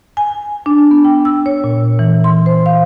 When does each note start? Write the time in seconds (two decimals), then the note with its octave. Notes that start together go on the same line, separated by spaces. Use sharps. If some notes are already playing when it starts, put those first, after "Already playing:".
0.17 G#5
0.66 D4
0.91 B3
1.05 G5
1.25 E6
1.46 C#5
1.64 A#2
1.99 E3
2.24 C6
2.46 C5
2.66 F5